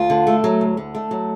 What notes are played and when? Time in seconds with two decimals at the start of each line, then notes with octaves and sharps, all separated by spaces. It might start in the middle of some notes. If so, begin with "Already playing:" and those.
Already playing: D2 F4
0.10 D3
0.27 A3
0.44 F#3
0.61 D2
0.77 D3
0.95 A3
1.11 F#3